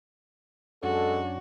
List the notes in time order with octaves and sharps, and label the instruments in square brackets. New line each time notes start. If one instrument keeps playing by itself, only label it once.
[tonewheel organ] F#2 C#4 D4 [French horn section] G#3 A4 [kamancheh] F#4